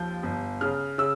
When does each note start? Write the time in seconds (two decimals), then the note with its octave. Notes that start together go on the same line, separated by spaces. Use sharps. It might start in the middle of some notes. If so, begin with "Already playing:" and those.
Already playing: D#2 F3 G6
0.23 G1
0.61 C#3 F6
0.98 C#3 E6